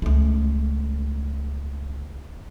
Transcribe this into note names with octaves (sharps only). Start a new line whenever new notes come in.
C#2 A3